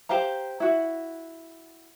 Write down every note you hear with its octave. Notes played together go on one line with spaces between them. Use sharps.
G4 C5 F5 A#5
E4 F#4